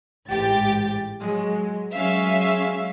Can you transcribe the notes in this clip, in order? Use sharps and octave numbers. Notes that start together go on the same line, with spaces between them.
A1 G#2 G4 A6
F#3 G#3
F#3 G#3 C#4 E5 F5